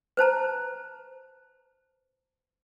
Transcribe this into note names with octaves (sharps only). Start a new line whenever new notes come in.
B4 C5 A5 A#5